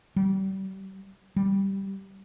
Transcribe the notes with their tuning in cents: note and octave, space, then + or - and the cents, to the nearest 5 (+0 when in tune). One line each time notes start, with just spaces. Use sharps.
G3 -35
G3 -5